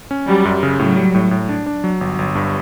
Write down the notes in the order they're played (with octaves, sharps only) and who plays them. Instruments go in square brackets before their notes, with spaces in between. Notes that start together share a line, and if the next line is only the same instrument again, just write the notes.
[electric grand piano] C#4
[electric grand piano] F#3 [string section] G3
[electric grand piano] F#2
C#3
[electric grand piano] A2 [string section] F#3
[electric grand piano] G3
A2
A2
D4
D4
F#3
G1
G1
G2